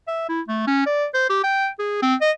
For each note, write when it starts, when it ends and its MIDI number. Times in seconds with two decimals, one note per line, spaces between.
0.08 0.25 76
0.29 0.41 64
0.48 0.63 57
0.67 0.82 61
0.86 1.06 74
1.14 1.25 72
1.29 1.39 67
1.44 1.69 79
1.79 2.00 68
2.02 2.15 60
2.21 2.31 75